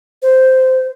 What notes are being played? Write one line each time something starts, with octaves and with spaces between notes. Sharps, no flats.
C5